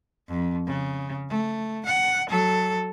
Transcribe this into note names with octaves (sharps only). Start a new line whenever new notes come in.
F2
C#3
A3
F#5
F#3 A4